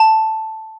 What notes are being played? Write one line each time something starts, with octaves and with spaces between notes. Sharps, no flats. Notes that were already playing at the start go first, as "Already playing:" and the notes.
Already playing: A5